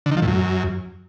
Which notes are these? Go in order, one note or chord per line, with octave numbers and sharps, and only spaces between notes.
D3
D#3
F3
A2
F#2